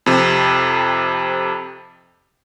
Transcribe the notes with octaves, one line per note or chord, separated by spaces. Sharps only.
F2 C3